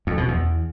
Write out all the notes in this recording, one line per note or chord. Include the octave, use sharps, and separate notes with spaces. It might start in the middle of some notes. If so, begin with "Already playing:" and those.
F2
B2
E2